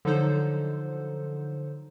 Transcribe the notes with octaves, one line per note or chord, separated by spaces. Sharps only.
D3 F3 F#3 D#4 A4 C5